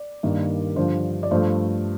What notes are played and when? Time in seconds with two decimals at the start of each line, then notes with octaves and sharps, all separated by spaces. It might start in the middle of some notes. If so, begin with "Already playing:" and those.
Already playing: D5
0.23 G2 D#3 A#3
0.76 G2 D3 F3 C5
1.23 D5
1.31 G2 F3 A3 C5